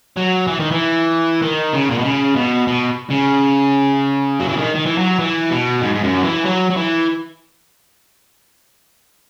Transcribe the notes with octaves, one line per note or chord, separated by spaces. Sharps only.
F#3
E3
D#3
E3
D#3
C#3
A#2
B2
C#3
B2
B2
C#3
F#3
E3
D#3
D#3
E3
F#3
E3
B2
G#2
G#2
F#2
F#3
E3
F#3
F#3
E3